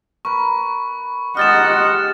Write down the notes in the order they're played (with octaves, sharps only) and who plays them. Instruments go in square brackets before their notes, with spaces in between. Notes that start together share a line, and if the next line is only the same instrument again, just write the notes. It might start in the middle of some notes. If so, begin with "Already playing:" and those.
[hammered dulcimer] A#4 B4 [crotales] C#6
[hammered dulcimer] G#3 D#4 G4 [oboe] D#5 [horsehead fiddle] F#5 [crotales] F6 A6 E7